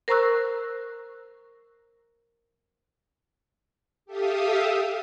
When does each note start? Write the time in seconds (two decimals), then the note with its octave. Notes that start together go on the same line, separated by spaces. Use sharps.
0.08 A#4 C5 A#5 C#6 E6 F#6
4.06 G4 A4 E5 F5 D#6